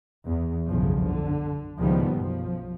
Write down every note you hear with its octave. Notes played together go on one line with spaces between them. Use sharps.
E2
F#1 B1 E2 G2 C#3 F3
D3
C#2 A2 D#3 F3 G3 B3
B1 F#2 F3